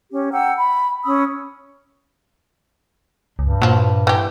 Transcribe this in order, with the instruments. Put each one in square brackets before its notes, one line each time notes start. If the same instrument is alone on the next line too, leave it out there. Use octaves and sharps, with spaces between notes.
[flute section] C#4 G4
F#5 G5 A#5 E6
B5
C#4 B5 D#6 E6
[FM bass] C#2 [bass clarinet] G2
[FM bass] A#2 [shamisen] F3 F#3
[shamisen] E3 G4